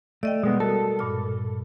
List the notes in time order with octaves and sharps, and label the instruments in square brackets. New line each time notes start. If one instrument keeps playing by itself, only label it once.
[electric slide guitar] A3 [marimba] D5 D#5 G5
[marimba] B2 G3 [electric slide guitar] G#3 B3
[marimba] F#4 A#4 [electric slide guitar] A4
[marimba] G2 A#2 F6